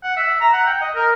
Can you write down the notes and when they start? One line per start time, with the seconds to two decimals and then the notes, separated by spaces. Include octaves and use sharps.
0.03 F#5
0.16 E5
0.41 A#5
0.53 F#5
0.66 G5
0.81 D#5
0.95 A#4